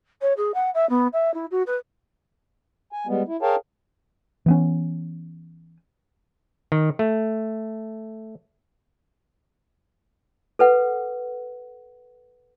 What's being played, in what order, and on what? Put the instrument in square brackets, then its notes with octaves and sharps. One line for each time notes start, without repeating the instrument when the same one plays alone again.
[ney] C#5
G#4
F#5
E5
B3
E5
E4
F#4
B4
[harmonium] G#5
G3 G#3 B3
E4
G#4 A#4 C#5 F5 G5 A5
[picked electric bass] E3 B3 C#4
[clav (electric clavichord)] D#3
A3
[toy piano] A4 B4 F#5